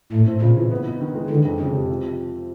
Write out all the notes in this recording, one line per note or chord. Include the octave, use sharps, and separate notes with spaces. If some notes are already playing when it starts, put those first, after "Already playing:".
A2 A3
C4
A#2 C#3
E3
B3
D#4
D#3
G#3
D3 E3
F2
F2 C#3
C3
F3